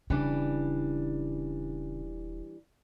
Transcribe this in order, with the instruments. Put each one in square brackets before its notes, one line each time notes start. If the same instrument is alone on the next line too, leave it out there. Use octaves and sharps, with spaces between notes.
[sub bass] D#1 [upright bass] C#3 [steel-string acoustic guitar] E3 G3 D4